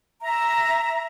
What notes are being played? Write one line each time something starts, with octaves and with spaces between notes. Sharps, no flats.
E5 A#5